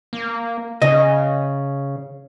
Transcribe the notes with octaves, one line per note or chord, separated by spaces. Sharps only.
A#3
C#3 D#5